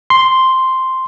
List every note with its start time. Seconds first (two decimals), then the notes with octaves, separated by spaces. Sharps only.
0.10 C6